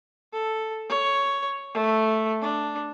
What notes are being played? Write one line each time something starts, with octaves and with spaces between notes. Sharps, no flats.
A4
C#5
A3
D4